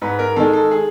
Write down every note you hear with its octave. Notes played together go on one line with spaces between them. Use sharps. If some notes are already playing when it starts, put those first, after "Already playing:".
G#2 B4
A#4
D#3 G#3 A4
A4
G#4